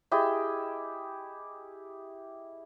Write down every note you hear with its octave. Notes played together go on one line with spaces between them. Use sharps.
E4 G4 G#4 D#5